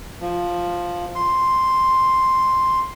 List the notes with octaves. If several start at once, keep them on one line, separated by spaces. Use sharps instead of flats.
F3
C6